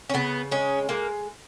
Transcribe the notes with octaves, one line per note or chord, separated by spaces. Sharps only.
C#4
C#3 B3
G#3 C#4
G#3 A#3